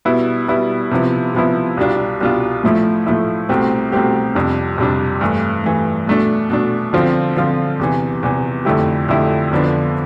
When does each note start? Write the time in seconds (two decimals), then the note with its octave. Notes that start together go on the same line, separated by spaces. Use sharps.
0.05 B2 G3 B3 E4
0.48 B2 G3 B3 E4
0.91 C3 F3 B3 E4
1.35 C3 F3 B3 E4
1.77 C2 B2 G3 D4 F4
2.21 C2 B2 G3 D4 F4
2.64 A2 F3 A3 E4
3.07 A2 F3 A3 E4
3.49 C2 B2 A3 C4 G4
3.92 C2 B2 A3 C4 G4
4.35 F2 C3 G3 D4
4.78 F2 C3 G3 D4
5.21 G2 E3 A3
5.64 G2 E3 A3
6.07 B2 A3 D4
6.50 B2 A3 D4
6.93 D3 F3 C4 F4
7.36 D3 F3 C4 F4
7.79 E2 C3 E3
8.23 E2 C3 E3
8.65 F2 D3 A3 E4 G4
9.09 F2 D3 A3 E4 G4
9.51 F2 D3 F3 B3 D4